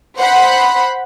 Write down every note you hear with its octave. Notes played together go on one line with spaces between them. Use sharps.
C5 F#5 B5